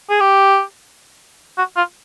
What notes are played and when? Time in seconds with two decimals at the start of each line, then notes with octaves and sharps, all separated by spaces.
0.10 G#4
0.20 G4
1.58 F#4
1.77 F4